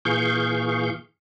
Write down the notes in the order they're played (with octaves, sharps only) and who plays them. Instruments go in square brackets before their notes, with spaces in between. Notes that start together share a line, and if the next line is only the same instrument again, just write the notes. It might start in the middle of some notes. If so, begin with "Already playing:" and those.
[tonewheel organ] A#2 E3 G#4 F5 C#6 G6